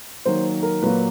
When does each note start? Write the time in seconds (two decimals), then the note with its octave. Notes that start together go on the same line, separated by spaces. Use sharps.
0.25 D#3 F#3 A#3 C5
0.63 A#4
0.82 A#2 F#3 A#3 B4